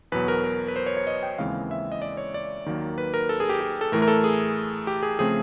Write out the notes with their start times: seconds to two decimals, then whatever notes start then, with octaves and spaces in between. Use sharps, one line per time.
0.12 E2 B2 F#3 B3 B4
0.28 A#4
0.44 A#4
0.68 B4
0.76 C5
0.86 C#5
0.97 C#5
1.07 D#5
1.23 G5
1.38 D#2 C#3 E3 G#3 C4 F5
1.71 E5
1.92 D#5
2.02 D5
2.17 C#5
2.34 D5
2.66 D#2 D#3 F#3 A#3
2.98 B4
3.14 A#4
3.29 A4
3.40 G#4
3.49 G4
3.61 G4
3.81 A4
3.92 A2 E3 A3 A#4
4.02 A#4
4.08 A4
4.24 G#4
4.87 G4
5.03 G#4
5.19 C#3 F3 A3 C4 G#4